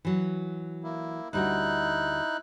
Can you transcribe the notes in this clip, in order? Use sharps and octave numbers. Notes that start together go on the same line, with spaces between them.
E3 F#3
A#3 E4
D2 G3 D#4 E4 F#4 F#6